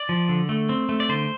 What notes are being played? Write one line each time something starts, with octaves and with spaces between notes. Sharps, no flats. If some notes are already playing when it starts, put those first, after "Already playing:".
Already playing: D5
F3
D3
A3
C4
A3
D5
D3 C5